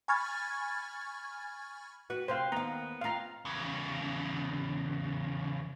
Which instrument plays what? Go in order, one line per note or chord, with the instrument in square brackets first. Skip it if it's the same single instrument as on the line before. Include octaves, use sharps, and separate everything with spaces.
[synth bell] G#5 B5 C#6 F6 G#6 A6
[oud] F#4 [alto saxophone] B4
[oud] C3 C4 [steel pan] C5 F5
[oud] D#2 F5 [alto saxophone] B3 [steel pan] A#5
[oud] C4 F4 [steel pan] F5 A#5
[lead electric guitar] E2 C#3